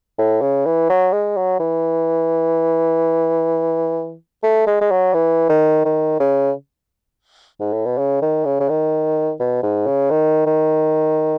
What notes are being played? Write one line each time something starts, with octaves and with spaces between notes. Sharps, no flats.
A2
C#3
E3
F#3
G#3
F#3
E3
A3
G#3
G#3
F#3
E3
D#3
D#3
C#3
G#2
A2
B2
C#3
D#3
C#3
C#3
D#3
B2
G#2
C#3
D#3
D#3